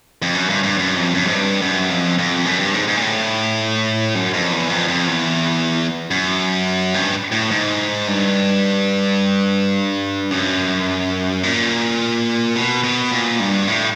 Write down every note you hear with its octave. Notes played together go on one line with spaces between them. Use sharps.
F2
F#2
G2
G2
F#2
F2
F#2
G#2
G2
F#2
F2
F2
F#2
G2
G#2
G#2
A#2
A2
F#2
F2
E2
F2
F2
E2
F#2
G2
A2
G#2
G2
F#2
A#2
B2
B2
A#2
G2
A2